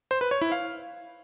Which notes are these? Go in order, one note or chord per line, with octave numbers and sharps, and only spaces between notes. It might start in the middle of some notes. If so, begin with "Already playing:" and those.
C5
B4
C#5
E4
F5